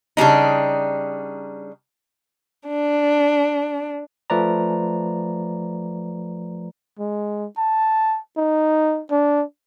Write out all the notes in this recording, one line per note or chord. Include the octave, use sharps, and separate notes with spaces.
C#3 G3 D4 D#4
D4
F3 A3 B4 D5 A#5
G#3
A5
D#4
D4